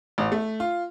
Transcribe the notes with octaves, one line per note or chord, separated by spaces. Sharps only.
A1
A3
F4